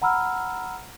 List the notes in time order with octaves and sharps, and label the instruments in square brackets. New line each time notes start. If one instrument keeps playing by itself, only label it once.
[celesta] F#5 A#5 B5 E6 F6